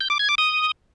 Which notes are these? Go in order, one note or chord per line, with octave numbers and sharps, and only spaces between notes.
G6
D6
G#6
D6
D#6